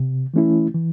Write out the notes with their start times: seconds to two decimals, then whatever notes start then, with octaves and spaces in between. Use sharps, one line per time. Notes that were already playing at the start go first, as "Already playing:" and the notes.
Already playing: C3
0.34 E3 A3 C#4 E4
0.74 E3